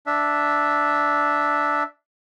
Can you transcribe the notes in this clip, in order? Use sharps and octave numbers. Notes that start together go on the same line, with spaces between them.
D4 E5